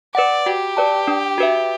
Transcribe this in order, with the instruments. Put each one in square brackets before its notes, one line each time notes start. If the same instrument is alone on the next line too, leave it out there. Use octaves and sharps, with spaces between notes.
[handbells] B4 F#5 [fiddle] D5
[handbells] F#4 [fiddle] G4
[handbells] B4 D5 A5
D4
F#4 B4 E5